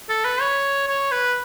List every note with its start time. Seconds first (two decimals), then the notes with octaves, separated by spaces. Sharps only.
0.09 A4
0.25 B4
0.41 C#5
0.88 C#5
1.12 B4